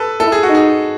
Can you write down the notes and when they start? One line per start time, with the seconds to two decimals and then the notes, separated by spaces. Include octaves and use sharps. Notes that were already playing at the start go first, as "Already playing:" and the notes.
Already playing: A4 B4
0.20 E4 A4
0.32 G#4
0.43 F#4
0.49 D#4
0.55 G#4